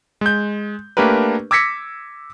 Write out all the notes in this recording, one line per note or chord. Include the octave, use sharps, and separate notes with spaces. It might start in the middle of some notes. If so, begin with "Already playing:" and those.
G#3 G6
A3 A#3 D4 G4 A#4 B4
D6 E6 G#6 A#6 B6 C#7